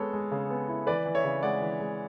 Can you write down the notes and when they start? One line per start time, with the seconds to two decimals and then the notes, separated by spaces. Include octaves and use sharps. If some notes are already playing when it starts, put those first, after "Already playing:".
Already playing: G#3 B3 A4 C#5
0.13 G#3
0.31 C#3
0.50 B3
0.69 E4
0.87 E3 B4 D5
1.06 E3
1.15 C#5 E5
1.24 C#3
1.43 G#3 D5 F#5
1.62 E3
1.80 G#3